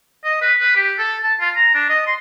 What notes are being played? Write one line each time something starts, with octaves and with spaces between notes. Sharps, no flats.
D#5
B4
B4
G4
A4
A5
F4
A#5
D4
D#5
C6